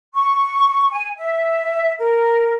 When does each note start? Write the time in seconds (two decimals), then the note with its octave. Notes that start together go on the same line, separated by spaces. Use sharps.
0.14 C#6
0.91 G#5
1.17 E5
1.99 A#4